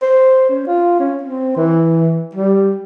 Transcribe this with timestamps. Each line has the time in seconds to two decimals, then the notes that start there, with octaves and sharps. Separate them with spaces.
0.02 C5
0.49 C#4
0.67 F4
1.00 C#4
1.23 C4
1.56 E3
2.35 G3